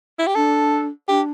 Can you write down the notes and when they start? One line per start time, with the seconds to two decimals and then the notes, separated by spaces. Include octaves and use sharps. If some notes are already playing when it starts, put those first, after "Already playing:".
0.19 E4
0.27 G4
0.35 D4 A4
1.08 D4 G4